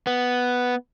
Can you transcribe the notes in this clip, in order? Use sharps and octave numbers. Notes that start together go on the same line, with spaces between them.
B3